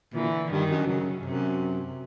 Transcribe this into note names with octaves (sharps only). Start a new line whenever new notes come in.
A#2 D3 E3
G2 D#3
F#2
F#2 C#3
F#2 C3